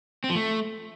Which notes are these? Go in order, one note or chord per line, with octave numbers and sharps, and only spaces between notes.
C4
F3
A3